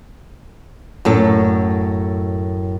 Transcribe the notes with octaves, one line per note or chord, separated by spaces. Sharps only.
F#2 A2 A4